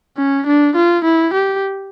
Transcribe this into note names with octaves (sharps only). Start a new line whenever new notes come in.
C#4
D4
F4
E4
G4